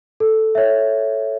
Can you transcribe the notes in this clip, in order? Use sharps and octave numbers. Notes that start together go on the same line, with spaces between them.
A4
C#5 E5